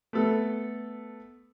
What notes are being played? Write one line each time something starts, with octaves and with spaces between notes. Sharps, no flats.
A3 B3 A4